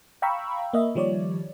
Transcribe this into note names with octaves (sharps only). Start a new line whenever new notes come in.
F5 G5 A#5 B5 C#6 E6
A#3 D#5 E5
D#3 F3 G3 C#5 D5